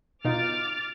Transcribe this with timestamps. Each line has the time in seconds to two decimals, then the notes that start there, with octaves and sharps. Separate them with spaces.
0.25 B2 D#4 F4 D6 F6 A6